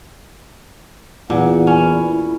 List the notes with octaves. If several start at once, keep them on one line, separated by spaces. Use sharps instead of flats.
E2 A#2 F#5
C#4 E4